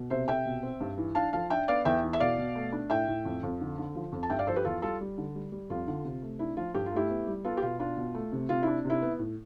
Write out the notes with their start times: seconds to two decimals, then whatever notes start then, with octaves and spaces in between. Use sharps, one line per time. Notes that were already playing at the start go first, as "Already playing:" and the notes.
Already playing: B2
0.10 C3 C5 E5
0.28 C3 E5 G5
0.46 B2
0.63 C4
0.80 G2
0.97 E3
1.15 D4 F5 A5
1.33 F3 F5 A5
1.50 D4 E5 G5
1.68 B3 D5 F5
1.85 E2 E5 G5
2.03 E3
2.13 E5
2.20 B2 D5 F5
2.38 B2
2.55 A3
2.72 D4
2.90 A2 E5 G5
3.08 A2
3.25 F2
3.43 F2
3.61 D3
3.78 D3
3.95 F3
4.12 F2
4.23 A5
4.30 G2 E5 G5
4.39 D5 F5
4.47 F3 A4 C5
4.56 G4 B4
4.65 E2 F4 A4
4.82 G3 F4 A4
5.01 G3
5.18 D3
5.35 G3
5.52 G3
5.70 F2 F4
5.87 D3
6.05 C3
6.22 A3
6.39 D4 E4
6.57 F3 F4
6.74 G2 G4
6.86 F4
6.92 A3 E4 G4
7.10 B3
7.27 G3
7.45 B3 F4 A4
7.57 G4
7.62 B2 F4
7.79 D4 F4
7.97 B2
8.14 A3
8.32 C3
8.49 C3 F4
8.63 D4 E4
8.85 C3 E4
9.02 B3
9.19 A2